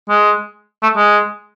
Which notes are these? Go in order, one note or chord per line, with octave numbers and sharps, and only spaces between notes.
G#3
A3
G#3